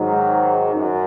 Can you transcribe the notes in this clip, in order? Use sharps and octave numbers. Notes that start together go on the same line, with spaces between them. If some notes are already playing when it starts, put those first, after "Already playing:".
Already playing: G#2 D#3 F#3
F#2